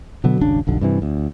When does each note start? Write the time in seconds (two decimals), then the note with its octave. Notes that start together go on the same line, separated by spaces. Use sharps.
0.24 B2 D3 F#3 B3
0.41 D#1 G#1 C#3 D4
0.67 F1 B1 D3
0.81 G2 C3 E3
1.02 D2